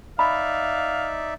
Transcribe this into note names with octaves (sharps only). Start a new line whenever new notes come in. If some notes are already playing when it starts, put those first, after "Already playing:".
D#4 D5 E5 F5 B5